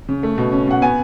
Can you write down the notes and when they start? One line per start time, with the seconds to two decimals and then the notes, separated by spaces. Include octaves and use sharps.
0.09 C#3
0.23 A3
0.38 B2
0.52 C#4
0.68 B2 F#5
0.82 B3 G#5